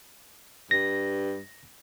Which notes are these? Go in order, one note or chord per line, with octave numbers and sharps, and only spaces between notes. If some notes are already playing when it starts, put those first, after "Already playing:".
G2 A#6